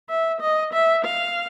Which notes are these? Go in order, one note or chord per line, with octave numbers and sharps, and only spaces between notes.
E5
D#5
E5
F5